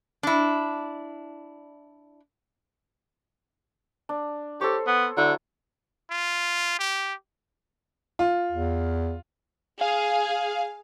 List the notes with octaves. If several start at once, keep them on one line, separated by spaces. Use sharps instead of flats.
D4 E4
D4
G4 A4 C5 C#5
B3
D3 F#3 E4
F4
G4
F4
E2
G#4 F5